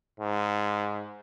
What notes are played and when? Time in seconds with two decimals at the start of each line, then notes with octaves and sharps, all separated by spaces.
0.20 G#2